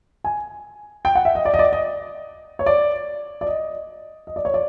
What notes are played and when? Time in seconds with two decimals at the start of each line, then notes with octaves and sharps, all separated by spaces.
0.24 G#5
1.05 G5
1.15 F#5
1.25 E5
1.35 D#5
1.45 D5
1.54 D#5
1.59 D5
1.73 D#5
2.59 C#5
2.66 D5
3.41 D5
3.47 D#5
4.27 D#5
4.36 D5
4.45 C#5
4.54 D5